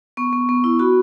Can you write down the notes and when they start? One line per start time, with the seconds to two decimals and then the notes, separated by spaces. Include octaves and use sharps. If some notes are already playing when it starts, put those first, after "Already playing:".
0.17 B3 C#6
0.33 B3
0.49 B3
0.64 E4
0.79 F#4 B5